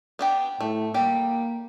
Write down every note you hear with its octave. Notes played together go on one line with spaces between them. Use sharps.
B3 D4 G4
A2 A3
G3 A#3 G4